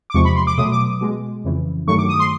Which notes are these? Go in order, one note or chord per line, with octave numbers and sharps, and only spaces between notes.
D6
E2 C3 F3 G#3 C#6
B5
C6
D6
B2 F#3 A3 D#6
D6
B2 G#3
F2 C#3 E3
G2 D#3 F#3 A3 C#6
D6
D#6
C6